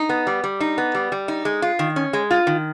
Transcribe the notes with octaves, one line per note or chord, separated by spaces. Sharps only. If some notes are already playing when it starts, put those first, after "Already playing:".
Already playing: D#4
B3
G3
G3
D#4
B3
G3
G3
D#4
G#3
F4
D#3
C#4
G#3
F4
D#3